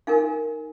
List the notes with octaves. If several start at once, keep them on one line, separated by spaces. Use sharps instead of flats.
D#4 A#4 F5 G#5